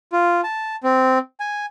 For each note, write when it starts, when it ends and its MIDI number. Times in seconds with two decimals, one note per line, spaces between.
0.13 0.41 65
0.44 0.76 81
0.84 1.18 60
1.40 1.66 80